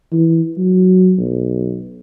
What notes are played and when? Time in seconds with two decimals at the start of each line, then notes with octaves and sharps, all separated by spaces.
0.12 E3
0.58 F#3
1.19 B1